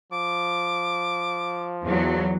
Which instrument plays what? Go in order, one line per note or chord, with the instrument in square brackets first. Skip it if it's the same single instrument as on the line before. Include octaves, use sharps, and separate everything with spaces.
[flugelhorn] F3 [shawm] D6
[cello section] E2 F#3